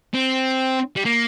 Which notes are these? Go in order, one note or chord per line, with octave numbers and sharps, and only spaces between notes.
C4
G3
A#3